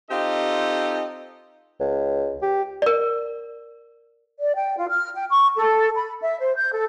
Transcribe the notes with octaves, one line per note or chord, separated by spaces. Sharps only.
C4 D#4 F4 G4 A4 D#5
C#2
G4
A#4 D5
D5
G5
F4
F6
G5
C#6
A4
B5
E5
C5
G6
A4